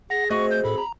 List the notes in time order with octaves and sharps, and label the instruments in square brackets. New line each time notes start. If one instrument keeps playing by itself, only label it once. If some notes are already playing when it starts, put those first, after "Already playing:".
[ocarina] G#4 [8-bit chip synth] F#5 [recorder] A#6
[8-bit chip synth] A3 [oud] C4 F#4 D#5 [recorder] C#6
[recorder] G6
[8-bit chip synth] A2 A4 [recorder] B5
[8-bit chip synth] A#5